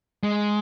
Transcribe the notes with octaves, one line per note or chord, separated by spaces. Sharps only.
G#3